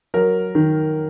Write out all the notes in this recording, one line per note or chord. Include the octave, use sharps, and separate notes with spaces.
F#3 A#4
D#3